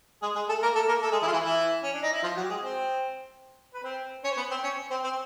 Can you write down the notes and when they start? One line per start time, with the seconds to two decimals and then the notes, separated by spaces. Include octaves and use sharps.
0.22 G#3 G#4
0.35 G#3 G#4
0.49 A3 A4
0.62 A#3 A#4
0.75 A3 A4
0.88 A#3 A#4
1.02 A3 A4
1.12 G#3 G#4
1.22 E3 E4
1.27 F4
1.32 E3 E4
1.43 E3 E4
1.83 C#4
1.93 D4
2.03 D#4
2.12 E4
2.23 F3 F4
2.37 F#3 F#4
2.44 G4
2.50 G#3 G#4
2.63 C4 C5
3.74 B4
3.84 C4 C5
4.24 C#4 C#5
4.31 C5
4.37 B3 B4
4.51 C4 C5
4.64 C#4 C#5
4.90 C4 C5
5.04 C4 C5